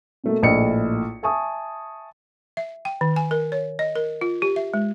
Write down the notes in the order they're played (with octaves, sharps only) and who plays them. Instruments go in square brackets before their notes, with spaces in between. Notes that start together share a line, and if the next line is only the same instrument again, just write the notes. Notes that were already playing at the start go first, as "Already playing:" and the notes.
[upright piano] B2 A3 A#3
A#1 A2 D#5 B5 C#7
E5 G#5 A5 C#6 D#6
[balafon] E5
G5
D#3
G#5
A#4
C#5
D#5
A#4
F4
G4
E5
G#3